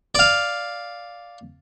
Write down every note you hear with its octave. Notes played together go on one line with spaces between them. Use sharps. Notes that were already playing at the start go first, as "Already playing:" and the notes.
D5 F5